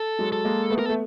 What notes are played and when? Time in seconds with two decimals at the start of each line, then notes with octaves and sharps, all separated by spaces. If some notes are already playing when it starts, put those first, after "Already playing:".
Already playing: A4
0.19 F#3 G#3
0.32 A4
0.45 G#3 A#3
0.70 A3 B3
0.79 A#4
0.86 A4
0.89 A3